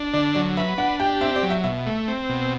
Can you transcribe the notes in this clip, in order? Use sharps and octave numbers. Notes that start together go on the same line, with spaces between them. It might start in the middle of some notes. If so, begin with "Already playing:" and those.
Already playing: D4
D3 D5
F#3 D5
B4 E5
D4 F#5
G4 G5
C4 E5
D5
F#3
E5
B2 E5
A3
C4
B2